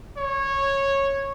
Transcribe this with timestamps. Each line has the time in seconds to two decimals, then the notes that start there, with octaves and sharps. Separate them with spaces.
0.17 C#5